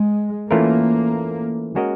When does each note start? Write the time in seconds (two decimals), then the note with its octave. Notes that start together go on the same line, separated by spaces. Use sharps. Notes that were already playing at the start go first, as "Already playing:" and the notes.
Already playing: G#3
0.51 E3 A3 A#3 C#4 F4 A#4
1.75 G#3 C#4 F#4 A#4 D#5